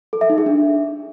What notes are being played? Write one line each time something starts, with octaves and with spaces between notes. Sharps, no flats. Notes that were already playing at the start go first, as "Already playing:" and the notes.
A4
E5
D#4
G#4
D4